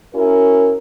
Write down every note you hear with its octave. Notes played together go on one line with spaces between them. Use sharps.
C#4 E4 F#4 A#4